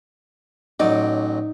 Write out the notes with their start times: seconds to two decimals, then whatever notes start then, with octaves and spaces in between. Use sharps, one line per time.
0.80 A1 F#3 D#4 D5